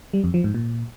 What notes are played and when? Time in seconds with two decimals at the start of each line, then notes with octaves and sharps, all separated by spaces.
0.14 G3
0.24 F2
0.34 F3
0.44 G#2
0.54 A#2